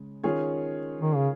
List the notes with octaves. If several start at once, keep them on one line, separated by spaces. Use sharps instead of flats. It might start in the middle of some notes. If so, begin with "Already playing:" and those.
Already playing: C#3 G#3
D#3 C#4 F4 G#4 C#5
D#3
C#3